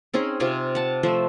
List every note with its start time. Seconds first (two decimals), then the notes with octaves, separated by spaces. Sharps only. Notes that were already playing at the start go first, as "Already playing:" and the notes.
0.14 C4 C#4 D#4 G#4
0.40 C3 F4 G4 G#5
0.75 F#5 A5
1.03 F3 A3 C5 E5